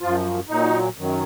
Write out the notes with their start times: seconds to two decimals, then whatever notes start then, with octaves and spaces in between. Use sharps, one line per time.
0.01 F#2 F3 F4
0.49 A#2 F#3 D#4
0.98 F#2 D#3 F#3